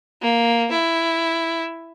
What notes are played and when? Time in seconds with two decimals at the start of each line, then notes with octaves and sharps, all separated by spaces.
0.22 A#3
0.72 E4